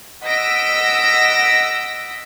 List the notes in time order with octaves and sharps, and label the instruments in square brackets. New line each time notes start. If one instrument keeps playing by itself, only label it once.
[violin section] D#5 F#5 E6 A#6 B6 D7